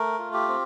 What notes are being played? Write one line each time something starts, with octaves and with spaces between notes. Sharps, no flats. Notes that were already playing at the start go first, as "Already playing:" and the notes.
Already playing: A3 A#4
F4
G4
C4